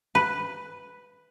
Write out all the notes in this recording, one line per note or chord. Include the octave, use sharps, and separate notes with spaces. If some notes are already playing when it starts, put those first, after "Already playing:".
B4